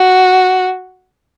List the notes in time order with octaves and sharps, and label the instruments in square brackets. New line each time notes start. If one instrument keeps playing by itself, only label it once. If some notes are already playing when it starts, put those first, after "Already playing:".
Already playing: [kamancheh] F#4